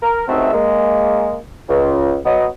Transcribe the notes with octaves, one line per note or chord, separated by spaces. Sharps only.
A#4
C#2 A3 C4 D#4 F#4 E5
G#3 A#3
C#2
F#3 B3 D#5